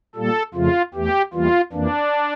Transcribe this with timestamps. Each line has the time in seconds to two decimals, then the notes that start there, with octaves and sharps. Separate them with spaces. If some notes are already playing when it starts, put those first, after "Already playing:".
0.15 A#2 G3 A#3 A4
0.54 F2 C#3 F3 A3 F4
0.94 E2 E3 A3 G4
1.33 E2 E3 G3 A#3 F4
1.73 F2 E3 A#3 D4